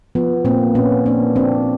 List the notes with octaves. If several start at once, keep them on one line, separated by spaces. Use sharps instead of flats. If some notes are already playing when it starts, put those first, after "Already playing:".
F3 B3
A#2 A#3 C4
A#2 B3 C#4
A#3 C4 D4
F3 C4 D4